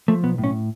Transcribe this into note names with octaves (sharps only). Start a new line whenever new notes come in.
F3 A3
B1 B3
A2
C#4